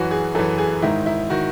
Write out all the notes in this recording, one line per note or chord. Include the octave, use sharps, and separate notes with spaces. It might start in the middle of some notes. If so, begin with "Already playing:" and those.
Already playing: F#2 E3 F#4
G#4
F#2 E3 A4
G#4
G#2 D#3 E4
E4
D#3 F#4